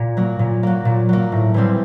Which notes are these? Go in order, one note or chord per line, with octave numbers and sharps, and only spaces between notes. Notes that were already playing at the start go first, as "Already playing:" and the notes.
Already playing: A#2
F#3 A#3
A#2
F#3 A#3
A#2
F#3 A#3
A2
E3 G3 C4